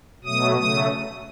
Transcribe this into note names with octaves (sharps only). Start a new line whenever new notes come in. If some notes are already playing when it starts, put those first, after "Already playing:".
B2 F#3 A3 D#6
C#3 F#3 A3 D#6